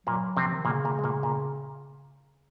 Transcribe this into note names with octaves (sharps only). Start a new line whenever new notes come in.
A#2 F#3 A#3
C3 F3 C4
D#3
A#2 C#3 A#3
A#2 A#3
G#3
A#2 A#3
A#2 A#3